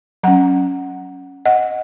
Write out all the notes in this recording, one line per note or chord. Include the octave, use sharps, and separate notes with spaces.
F#3 C#4 F#5 A#5
D#5 F#5